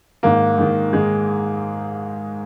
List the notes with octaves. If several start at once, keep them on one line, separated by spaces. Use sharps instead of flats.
G#2 D#3 A#3
G#2 D#3
G#2 D#3 G#3